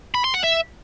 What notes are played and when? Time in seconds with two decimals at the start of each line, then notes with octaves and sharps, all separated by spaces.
0.15 B5
0.24 C6
0.34 F#5
0.44 E5